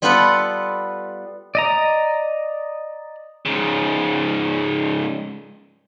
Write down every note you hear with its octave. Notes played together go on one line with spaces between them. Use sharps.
G3 B3 F4 A4 B4 F#5
D5 D#5 A#5
G#2 C#3